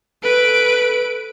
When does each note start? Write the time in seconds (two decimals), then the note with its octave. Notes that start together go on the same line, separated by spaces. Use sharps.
0.24 A4 B4 D7